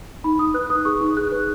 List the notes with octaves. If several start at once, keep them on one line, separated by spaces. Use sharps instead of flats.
D#4 B5
D#4 D#6
B4 F#6
B4 D#6
G#4 C#6
D#4
G#4 F#6
B4